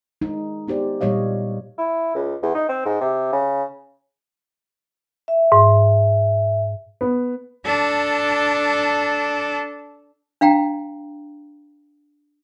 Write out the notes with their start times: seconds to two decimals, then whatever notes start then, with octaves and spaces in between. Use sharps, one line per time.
0.21 G#3 D#4
0.67 B3 D#4 G4 C5 D5
1.01 A#2 G3 C#5 D#5 F5
1.78 E4
2.15 C#2
2.43 E2
2.55 D#4
2.69 C4
2.86 G#2
3.01 C3
3.33 C#3
5.28 E5
5.52 G#2
7.01 B3
7.66 D4 A4
10.41 D4 F5 G5 A#5